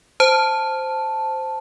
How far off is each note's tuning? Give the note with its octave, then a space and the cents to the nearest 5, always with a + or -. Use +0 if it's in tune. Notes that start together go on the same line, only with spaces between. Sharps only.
C5 +0 A5 +0